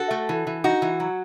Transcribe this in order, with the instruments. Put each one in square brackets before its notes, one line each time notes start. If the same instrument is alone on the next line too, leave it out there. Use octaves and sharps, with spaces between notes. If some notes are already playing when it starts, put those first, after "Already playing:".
Already playing: [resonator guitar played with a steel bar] F#4 A4
A3
E3
E3
D#4 F#4
E3
F#3